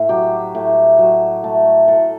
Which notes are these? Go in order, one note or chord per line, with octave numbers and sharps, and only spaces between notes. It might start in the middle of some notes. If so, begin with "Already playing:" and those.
Already playing: A2
F#3 G4
A2
F#3
A3
A2 A4